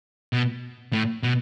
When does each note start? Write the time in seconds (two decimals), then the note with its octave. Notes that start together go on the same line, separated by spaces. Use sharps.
0.33 B2
0.93 A2
1.23 B2